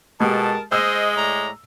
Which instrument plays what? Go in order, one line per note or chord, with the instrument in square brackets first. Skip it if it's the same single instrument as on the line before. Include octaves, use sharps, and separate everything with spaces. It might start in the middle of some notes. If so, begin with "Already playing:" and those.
[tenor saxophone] B2 [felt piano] G#3 G4 [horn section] A#4 A5
[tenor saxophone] G#3 [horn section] C5 D#5 [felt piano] E6
[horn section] A2 D5 A#5